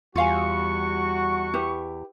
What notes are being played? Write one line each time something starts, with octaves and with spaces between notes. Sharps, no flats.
E2 G3 F4 F#4 F5 G#5 C#6
E4 G4 B4